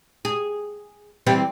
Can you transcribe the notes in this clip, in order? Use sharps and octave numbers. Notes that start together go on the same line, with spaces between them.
G#4
E3 G3 C4